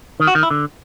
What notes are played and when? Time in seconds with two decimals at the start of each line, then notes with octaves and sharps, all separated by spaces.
0.20 D#3
0.27 F#4
0.35 D#3
0.43 E4
0.51 D3